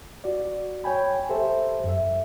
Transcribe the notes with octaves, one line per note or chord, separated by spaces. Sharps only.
F#4 D5
C#5 G5 G#5 B5
G4 A4 C5 E5
F#2 E5